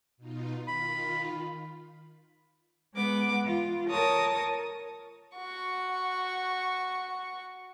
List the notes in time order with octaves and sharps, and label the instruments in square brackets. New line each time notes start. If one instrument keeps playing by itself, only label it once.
[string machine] B2 D#4 F4
[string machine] D#3 F4 [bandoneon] B5
[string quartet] G#3 B3 D6
F4
A#4 C#5 A5 D#6
[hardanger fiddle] F#4 C#6